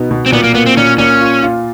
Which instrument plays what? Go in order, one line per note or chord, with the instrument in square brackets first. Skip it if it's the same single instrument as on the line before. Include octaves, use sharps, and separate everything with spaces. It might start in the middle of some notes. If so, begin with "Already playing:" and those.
Already playing: [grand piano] B2 B3 D#4
B2
[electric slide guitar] C4
[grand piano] A#2 [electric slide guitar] B3
[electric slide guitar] A#3
[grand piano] A#3 [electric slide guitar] B3
[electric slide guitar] C4
[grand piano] A#2 [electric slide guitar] C#4
[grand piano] A#2 [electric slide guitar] C#4
[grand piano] F4
F4